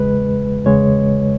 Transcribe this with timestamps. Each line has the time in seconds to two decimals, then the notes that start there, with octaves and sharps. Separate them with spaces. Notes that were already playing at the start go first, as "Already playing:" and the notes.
Already playing: E2 C#3 G#3 B4
0.65 E2 C#3 G#3 C#5